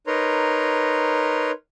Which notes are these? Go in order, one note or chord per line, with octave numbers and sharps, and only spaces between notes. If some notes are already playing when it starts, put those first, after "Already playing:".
D#4 A#4 B4 C#5 A#5 C6